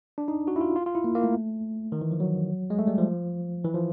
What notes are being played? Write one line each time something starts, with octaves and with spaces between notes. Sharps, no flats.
D4
D#4
F#4
E4
F4
F4
F4
E4
A#3
A#3
A3
D#3
E3
F3
F#3
G#3
A3
G3
F3
E3
F3